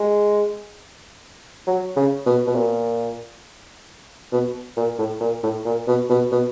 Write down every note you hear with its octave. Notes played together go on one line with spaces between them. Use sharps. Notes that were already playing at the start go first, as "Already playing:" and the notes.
Already playing: G#3
F#3
C#3
B2
B2
A#2
B2
A#2
A2
A#2
A2
A#2
B2
B2
B2